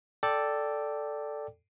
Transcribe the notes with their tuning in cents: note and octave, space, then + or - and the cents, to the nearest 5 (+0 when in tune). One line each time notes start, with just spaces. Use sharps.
A4 +0 D5 +0 G5 +0